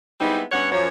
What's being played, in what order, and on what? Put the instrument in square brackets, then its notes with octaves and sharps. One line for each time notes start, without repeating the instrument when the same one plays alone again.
[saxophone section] G3 G#3 B3 C4 D#4 E4
G2 B3 C#4 C#5 F#5
F#2 F3 C#5